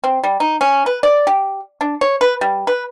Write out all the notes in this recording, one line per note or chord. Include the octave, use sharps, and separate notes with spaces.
C4
G3
D#4
C#4
B4
D5
G4
D4
C#5
B4
G3
B4